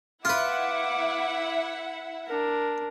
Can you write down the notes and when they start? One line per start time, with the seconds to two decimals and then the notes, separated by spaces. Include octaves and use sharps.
0.25 E4 F4 B4 E5 F#5 D6
2.28 D4 A#4